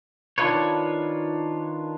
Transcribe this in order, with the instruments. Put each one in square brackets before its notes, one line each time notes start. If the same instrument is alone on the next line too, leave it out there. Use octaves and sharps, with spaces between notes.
[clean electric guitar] D#3 D4 D#4 F4 B4 C#5